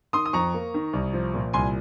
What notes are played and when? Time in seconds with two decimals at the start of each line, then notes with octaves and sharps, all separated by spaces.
0.13 D#3 C6 D#6
0.26 D#6
0.33 F2 A#5 C#6
0.54 A#3
0.74 D#3
0.93 C2
1.13 F3
1.34 A#2
1.53 C2 G#5 C6